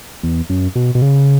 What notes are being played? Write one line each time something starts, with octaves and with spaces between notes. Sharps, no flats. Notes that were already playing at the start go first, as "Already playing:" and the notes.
E2
F#2
B2
B2
C#3